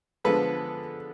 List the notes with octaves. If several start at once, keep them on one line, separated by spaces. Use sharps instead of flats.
D3 F3 G#3 B3 A4 B4